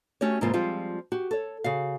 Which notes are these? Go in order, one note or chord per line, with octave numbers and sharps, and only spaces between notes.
A3 C#4 F#4 G4 C#5
G#2 C3 E3 A#3 C#4 F4
F3 G3 G#3 C4 F4
F#4 G4
A4 C#5
C#3 F#4 F5